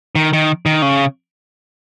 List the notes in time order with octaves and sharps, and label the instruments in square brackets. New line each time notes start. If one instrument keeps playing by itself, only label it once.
[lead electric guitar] D#3
D#3
D#3
C#3